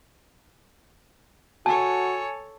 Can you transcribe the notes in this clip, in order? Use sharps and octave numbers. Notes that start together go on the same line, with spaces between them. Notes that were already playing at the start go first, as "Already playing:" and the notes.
F#4 A4 C#5 G#5 A5